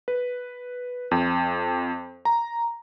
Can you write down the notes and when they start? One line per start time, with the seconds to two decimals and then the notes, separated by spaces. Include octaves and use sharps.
0.08 B4
1.11 F2
2.25 A#5